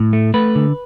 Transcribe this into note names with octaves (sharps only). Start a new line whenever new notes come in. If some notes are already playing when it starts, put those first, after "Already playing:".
Already playing: A2
A3
A3 B4
D3